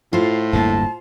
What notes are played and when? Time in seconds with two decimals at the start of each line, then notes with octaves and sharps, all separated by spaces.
0.13 A2 F4 C5
0.53 D1 G2 A#3 A5